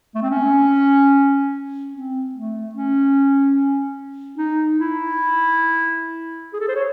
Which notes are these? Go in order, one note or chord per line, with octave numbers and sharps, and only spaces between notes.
A3
C4
C#4
C4
A3
C#4
D#4
E4
G#4
A4
C5
C#5